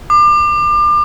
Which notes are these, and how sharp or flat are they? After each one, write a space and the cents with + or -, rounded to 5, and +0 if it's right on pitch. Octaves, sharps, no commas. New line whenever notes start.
D6 +30